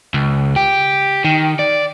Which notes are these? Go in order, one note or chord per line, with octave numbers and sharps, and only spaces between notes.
C#2
G4
D#3
D5